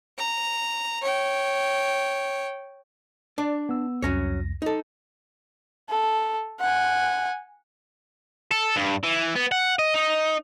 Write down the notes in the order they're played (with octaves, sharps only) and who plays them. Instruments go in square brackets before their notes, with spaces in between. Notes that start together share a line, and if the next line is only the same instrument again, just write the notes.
[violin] A#5
C#5 G5
[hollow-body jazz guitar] D4 D5
[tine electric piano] B3 E6
[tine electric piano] C2 F2 A#6 [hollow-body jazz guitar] F#3 C#4 C#5
[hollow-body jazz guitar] D#4 A4
[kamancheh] A4
F#5 G#5
[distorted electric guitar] A4
G2
E3
B3
F#5
D#5
D#4